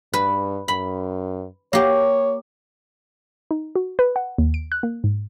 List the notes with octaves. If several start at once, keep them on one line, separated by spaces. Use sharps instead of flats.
G2 B4
F#2 B5
A#3 G4 C#5
D#4
F#4
B4
F#5
D#2
D7
F#6
A#3
G#2